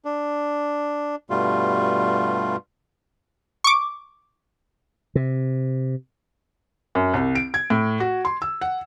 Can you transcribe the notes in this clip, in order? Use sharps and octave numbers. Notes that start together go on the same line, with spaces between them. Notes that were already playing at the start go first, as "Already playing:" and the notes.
D4
G2 B2 G3 A3 F4
C#6 D6
C3
F#2
C2
D7
G#6
A2
F#4
C6
E6
F#5